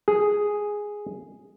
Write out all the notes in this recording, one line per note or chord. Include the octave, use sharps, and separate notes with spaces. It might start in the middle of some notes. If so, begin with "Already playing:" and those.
G#4